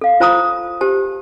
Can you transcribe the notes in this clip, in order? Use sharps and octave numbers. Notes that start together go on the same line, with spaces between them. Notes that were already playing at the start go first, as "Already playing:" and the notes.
A4 F5
F4 C5 A5 A#5 D#6
G4 C5 A5